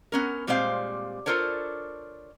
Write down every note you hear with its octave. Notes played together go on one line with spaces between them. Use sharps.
B3 C#4 A#4
A#2 G3 G#3 C4 C5 F5
D4 F4 A4 A#4 C5 C#5